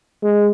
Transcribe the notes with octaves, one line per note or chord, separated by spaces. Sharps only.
G#3